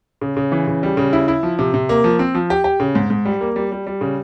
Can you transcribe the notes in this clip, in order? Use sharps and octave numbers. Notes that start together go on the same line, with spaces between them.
C#3
C#3
E3
C#3
G3
C#3
E4
E4
F3
C3
C3
A#3
F3
C4
F3
G4
G4
C#3
G#2
G#2
G3
A#3
G3
G3
G3
C#3